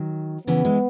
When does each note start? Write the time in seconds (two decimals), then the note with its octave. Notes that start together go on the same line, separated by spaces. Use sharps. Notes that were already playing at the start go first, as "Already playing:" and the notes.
Already playing: D#3 F#3
0.47 C#3 E3 B3
0.65 E3 G#3